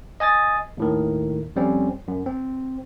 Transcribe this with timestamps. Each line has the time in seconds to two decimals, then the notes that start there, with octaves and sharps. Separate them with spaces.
0.20 D#5 G#5 D#6 A6
0.77 D#2 A2 D#3
1.56 F2 G3 C4 C#4
2.08 F#2
2.26 C4